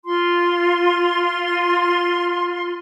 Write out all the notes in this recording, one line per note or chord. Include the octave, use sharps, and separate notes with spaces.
F4 C6